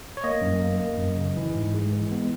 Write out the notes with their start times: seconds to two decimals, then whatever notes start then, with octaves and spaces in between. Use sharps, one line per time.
0.17 C#5
0.24 A#3 D#5
0.41 F#2
0.60 A#3
0.79 A#3
0.98 F#2
1.17 C#3
1.36 E3
1.55 G#2
1.74 G#3
1.93 E3
2.12 B3